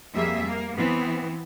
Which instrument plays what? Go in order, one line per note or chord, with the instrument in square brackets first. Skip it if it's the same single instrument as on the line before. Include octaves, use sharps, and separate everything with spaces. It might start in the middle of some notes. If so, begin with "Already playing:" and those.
[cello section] F2 G3 A#3 G#4 E5
A#3
E3 B3 C4